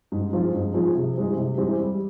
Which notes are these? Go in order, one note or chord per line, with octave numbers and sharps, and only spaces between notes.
G#2
F3 C4 F4 G#4
G#2
F3 C4 F4 G#4
C3
E3 G#3 C4 G4
C3
E3 G#3 C4 G4
G3